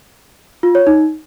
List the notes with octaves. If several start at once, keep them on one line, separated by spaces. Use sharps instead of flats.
F4
C#5
D#4